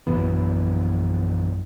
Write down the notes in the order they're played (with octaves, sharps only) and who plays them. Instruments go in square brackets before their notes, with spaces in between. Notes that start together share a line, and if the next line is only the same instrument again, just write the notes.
[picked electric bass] A#1 F#2 E3 B3